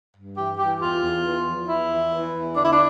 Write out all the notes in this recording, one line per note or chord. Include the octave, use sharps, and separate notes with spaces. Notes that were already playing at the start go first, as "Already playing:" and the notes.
G2
E3 G4
E3 G4
E2 F4
E2
E2
F3
E2 E4
E3
E3
E2
D3 D4
E4
D4